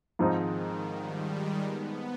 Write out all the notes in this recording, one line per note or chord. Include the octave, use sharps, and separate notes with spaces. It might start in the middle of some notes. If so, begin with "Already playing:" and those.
G#2 D#3 F3 G#3 C4 D#4
G3
G#3
B3